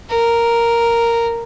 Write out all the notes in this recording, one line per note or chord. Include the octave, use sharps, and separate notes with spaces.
A#4